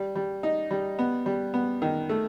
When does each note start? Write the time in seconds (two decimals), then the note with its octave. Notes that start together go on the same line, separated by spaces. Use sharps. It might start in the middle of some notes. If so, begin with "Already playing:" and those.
Already playing: G3
0.16 G3
0.43 D#4
0.71 G3
0.99 B3
1.26 G3
1.54 B3
1.82 D#3
2.09 A3